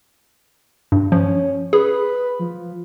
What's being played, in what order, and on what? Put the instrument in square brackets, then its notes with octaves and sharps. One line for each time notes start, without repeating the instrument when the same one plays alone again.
[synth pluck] G2
[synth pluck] F3 [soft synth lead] C#4
[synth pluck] G#4 [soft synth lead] B4
[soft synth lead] F3